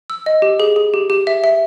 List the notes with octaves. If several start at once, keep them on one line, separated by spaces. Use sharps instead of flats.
E6
D#5
G4
G#4
G#4
G4
G4
E5
E5